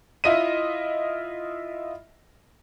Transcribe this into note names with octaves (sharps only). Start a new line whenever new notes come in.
E4 F4 D#5 E5 D#7